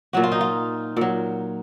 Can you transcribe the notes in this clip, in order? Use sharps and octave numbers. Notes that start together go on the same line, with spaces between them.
A#2 F#3 F#4
F4
D#4
F4
A#2 F#3